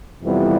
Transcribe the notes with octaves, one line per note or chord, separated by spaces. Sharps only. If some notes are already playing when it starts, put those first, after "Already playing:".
F2 C3 E3 G3 B3